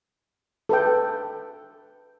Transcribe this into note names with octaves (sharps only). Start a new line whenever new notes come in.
A4 B4 G5